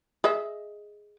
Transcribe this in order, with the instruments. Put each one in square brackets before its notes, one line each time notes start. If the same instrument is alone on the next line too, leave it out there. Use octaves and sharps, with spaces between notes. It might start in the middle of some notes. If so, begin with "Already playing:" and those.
[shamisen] G#4 D#5 E5